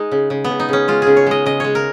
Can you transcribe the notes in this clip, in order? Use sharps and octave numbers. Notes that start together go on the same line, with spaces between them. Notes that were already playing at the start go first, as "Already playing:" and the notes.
Already playing: G#3 D#4
C#3
C#3
C#3 B3
D#4
C#3 C#4
G#3 F4
C#3 G#4
C#5
G#3 D#5
C#3 D#5
G#3 C#5
A#4